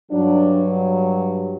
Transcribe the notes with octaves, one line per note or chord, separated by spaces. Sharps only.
G2 F#3 D4